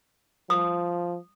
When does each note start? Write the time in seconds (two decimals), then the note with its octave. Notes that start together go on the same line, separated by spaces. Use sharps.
0.50 F3 D#6